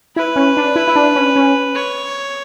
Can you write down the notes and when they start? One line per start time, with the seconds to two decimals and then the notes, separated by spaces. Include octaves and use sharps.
0.16 E4 B4
0.36 C#4
0.57 D4
0.76 E4
0.88 E4
0.96 D4
1.16 C#4
1.36 C#4
1.75 C#5